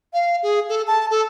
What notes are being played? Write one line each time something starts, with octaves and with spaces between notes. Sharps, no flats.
F5
G#4
A4
A5
A4